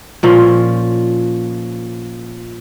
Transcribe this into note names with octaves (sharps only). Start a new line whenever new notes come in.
A#2 F3 C#4